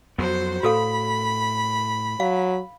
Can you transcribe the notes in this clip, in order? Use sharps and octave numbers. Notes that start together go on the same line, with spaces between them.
F2 F#3 B3 F#4 C5 C6
A2 F#4 A4 F5 B5
F#3 F5